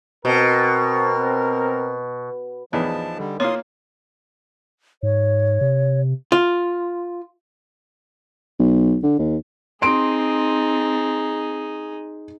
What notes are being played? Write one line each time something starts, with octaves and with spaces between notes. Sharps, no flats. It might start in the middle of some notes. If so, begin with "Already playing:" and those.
B2 C4 A#4
E2 A2 F3 D4 D#4 G#4 B4 A5
D3 G3
A#3 F4 C#5 C6 D#6
G#2 C#5
C3
F4
B1
D3
D#2
C4 D#4 G#4 C6 D7